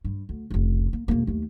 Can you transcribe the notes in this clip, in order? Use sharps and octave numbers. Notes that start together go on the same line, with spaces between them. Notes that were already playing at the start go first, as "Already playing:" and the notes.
G2
D2
F1 C#2
A#3
E1 A#3
D#2 A3